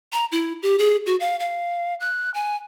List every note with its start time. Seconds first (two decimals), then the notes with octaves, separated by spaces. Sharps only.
0.13 A#5
0.32 E4
0.62 G4
0.79 G#4
1.06 F#4
1.20 F5
1.40 F5
2.00 F#6
2.34 G#5